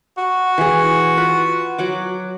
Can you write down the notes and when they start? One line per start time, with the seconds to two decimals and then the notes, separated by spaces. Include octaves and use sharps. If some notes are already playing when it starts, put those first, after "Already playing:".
0.18 F#4
0.58 E3 G#4
1.17 F4 B4
1.78 F#3 F#5 D6